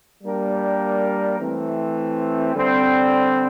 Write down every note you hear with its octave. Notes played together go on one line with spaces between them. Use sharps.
G3 A#3 D4 G4 A#4
E3 A3 C4
D3 G3 C4